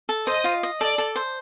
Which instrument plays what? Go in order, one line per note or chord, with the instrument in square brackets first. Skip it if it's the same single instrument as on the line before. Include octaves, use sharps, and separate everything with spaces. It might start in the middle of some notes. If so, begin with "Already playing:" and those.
[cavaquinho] A4
[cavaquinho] C5 [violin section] D#5
[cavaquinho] F4
D#5
[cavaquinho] A4 [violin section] D5
[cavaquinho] A4
C5